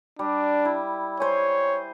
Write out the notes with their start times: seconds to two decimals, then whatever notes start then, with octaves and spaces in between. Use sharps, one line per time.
0.19 G3 D4
0.65 E4
1.20 C5 C#5 G#5